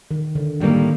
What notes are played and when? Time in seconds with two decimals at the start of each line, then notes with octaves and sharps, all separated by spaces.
0.11 D#3
0.35 D3
0.61 A2 D#3 G3 A#3